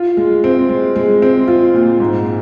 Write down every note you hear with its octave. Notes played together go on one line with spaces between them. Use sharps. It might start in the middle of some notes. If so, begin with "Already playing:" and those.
Already playing: F4
G#3
C4
G#3
G#3
C4
F4
A#2
G#2